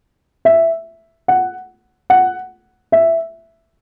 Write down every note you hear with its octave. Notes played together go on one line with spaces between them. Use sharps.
E5
F#5
F#5
E5